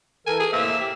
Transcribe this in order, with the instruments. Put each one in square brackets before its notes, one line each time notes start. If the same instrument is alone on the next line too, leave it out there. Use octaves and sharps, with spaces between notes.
[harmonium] E3 A4 A#4 [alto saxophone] G#5
[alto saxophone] G#4
[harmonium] A2 C3 C5 [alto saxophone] A#3 [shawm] E5
[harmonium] G4 E5 G5